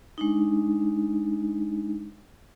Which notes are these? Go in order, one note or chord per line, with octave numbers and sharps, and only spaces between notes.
G#3 D4 D#4